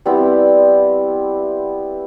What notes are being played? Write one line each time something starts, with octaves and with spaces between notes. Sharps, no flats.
G3 B3 C4 E4